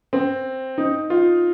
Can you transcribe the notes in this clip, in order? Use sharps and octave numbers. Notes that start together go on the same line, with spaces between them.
C4
D#4
F4